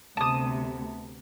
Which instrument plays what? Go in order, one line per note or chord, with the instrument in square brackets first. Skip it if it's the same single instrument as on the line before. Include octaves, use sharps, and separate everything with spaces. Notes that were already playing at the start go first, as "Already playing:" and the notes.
[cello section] D2 C3 B3 [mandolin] A5 D#6